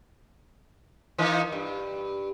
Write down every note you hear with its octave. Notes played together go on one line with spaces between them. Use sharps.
E3 A#3 D#4
G2